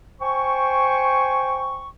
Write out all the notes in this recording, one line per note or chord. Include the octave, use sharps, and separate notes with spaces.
C5 G5 G#5 C#6